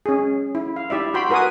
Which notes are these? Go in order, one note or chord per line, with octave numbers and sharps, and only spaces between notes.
C#4 G#4
E4
F5
E4 G4 D5 E5
F#4 G5 B5 C6
F#4 A#4 B4 F#5 G#5 D#6